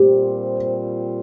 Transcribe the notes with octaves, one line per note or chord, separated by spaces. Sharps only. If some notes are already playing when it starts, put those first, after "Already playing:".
Already playing: A#2 G3 C4 F4 G4 C5